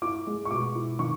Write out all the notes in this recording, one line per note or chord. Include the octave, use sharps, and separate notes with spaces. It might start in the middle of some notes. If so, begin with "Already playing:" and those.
E4 D6
G#3
C#6
B2 D6
E4
D#3 C#6